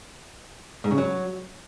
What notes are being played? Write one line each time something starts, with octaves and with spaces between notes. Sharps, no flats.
G#2
C#3
F#3